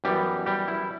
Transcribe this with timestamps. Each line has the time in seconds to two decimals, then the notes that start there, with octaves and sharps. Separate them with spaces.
0.04 F#2 E3 G3 B3 G4
0.46 G3 G4
0.68 E4